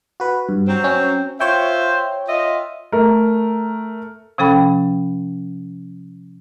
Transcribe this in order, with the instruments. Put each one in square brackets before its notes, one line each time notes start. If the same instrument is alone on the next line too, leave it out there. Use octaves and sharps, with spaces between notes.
[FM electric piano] F#4 B4
G2
[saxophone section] F#3 C4
[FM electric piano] C#4
[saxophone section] F4 C5 E5 [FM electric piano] C#5 G5
[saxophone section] F4 D#5 E5
[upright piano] A3 A#4
[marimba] C3 F3 C#4 A4 G5 B5